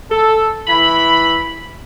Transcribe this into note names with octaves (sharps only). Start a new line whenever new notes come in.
A4
E3 E4 B5